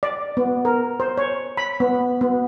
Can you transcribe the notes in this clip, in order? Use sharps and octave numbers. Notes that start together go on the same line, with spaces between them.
D5
B3
A#4
C5
C#5
B5
B3
B3